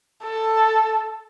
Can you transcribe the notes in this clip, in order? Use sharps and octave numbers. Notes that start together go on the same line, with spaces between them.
A4